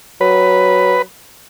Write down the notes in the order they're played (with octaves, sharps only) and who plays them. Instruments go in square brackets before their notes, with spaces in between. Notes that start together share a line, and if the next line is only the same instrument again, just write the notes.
[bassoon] F#3 [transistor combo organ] B4